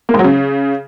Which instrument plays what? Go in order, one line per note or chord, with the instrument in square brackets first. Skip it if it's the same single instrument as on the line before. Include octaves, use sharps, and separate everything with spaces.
[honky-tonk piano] A#3
G#2
F#3
C#3